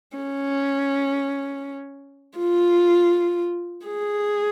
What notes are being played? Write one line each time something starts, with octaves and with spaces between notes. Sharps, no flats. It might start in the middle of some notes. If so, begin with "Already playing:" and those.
C#4
F4
G#4